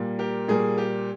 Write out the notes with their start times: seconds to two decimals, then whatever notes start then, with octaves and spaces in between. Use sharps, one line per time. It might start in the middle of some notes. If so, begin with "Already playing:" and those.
Already playing: A#2 G3 A#3
0.19 G4 A#4
0.48 A#2 G3 A#3 G#4
0.78 G4